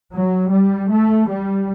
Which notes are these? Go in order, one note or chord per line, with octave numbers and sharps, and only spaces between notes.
F#3
G3
A3
G3